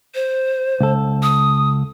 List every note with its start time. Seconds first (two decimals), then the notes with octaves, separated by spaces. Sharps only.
0.15 C5
0.81 C#2 A4
1.23 D#6